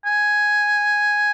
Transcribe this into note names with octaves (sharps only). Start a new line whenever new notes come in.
G#5